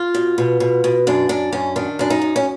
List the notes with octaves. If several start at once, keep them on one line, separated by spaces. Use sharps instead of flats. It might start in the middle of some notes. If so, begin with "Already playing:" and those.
Already playing: F4
B2
B2
B2
B2
F#2 D4
F#2 D4
F#2 C#4
D#3 D4
F#2 D4
D#4
F#2
C#4